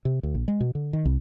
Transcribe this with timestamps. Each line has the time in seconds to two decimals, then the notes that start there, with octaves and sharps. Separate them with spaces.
0.05 C3
0.23 D2
0.35 A#1
0.48 G#3
0.60 B2
0.75 D3
0.93 D#3
1.05 C2